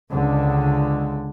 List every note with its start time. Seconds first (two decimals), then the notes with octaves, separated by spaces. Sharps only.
0.11 C#2 D3